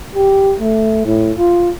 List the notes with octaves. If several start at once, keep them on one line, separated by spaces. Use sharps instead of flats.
G4
A3
A2
F4